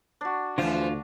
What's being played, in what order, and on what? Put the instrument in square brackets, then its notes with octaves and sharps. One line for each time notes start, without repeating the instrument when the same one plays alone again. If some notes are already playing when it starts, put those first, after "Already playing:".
[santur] D4 F#4
[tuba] D2 [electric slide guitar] D3 F4 [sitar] E3 F3 C5